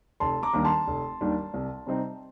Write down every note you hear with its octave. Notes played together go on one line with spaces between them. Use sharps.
F1 A5 C6
A#5 D6
D#2 D#3 G3 D4
A5 C6
F1
D#2 D#3 G3 D4
C2
C3 G3 C4 D#4